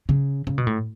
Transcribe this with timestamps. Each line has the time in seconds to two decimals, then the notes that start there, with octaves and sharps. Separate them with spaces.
0.09 C#3
0.47 C#3
0.58 B2
0.67 A2